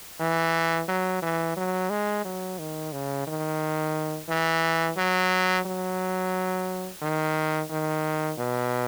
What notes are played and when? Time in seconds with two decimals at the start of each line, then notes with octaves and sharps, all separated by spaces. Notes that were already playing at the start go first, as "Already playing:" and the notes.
0.20 E3
0.89 F#3
1.22 E3
1.57 F#3
1.90 G#3
2.25 F#3
2.59 D#3
2.92 C#3
3.27 D#3
4.29 E3
4.97 F#3
5.66 F#3
7.02 D#3
7.71 D#3
8.38 B2